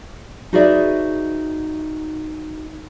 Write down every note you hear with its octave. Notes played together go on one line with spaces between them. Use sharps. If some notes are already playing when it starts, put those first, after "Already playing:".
D#4 F#4 G#4 B4 D5 E5